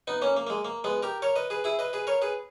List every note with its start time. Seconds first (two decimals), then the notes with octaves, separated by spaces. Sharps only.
0.07 B3 D#4
0.22 A#3 C#4
0.37 A#3
0.47 A#3
0.50 G#3
0.65 A#3
0.84 G#3 B3
1.03 G4 A#4
1.22 A#4 C#5
1.36 B4 D#5
1.50 G#4 B4
1.64 E4 G#4
1.79 B4 D#5
1.93 G#4 B4
2.07 A#4 C#5
2.22 G#4 B4